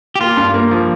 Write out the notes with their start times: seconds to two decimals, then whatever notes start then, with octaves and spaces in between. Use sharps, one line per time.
0.15 G4
0.21 A#3 F4
0.37 G2
0.54 A#3
0.71 F3